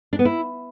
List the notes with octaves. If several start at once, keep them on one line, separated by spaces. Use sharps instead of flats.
D4
B3
E4